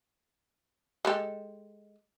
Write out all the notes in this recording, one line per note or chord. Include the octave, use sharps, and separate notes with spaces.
G#3 G4 A4